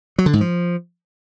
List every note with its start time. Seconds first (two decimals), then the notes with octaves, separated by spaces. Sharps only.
0.18 F#3
0.26 D3
0.33 G#2
0.41 F3